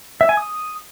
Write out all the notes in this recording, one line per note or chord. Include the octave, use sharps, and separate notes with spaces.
E5
G#5
D#6